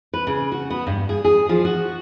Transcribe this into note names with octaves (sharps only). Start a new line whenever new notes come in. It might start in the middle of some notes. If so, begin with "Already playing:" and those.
B4
C#3
F#4
B3
G2
G#4
G#4
F3
F#4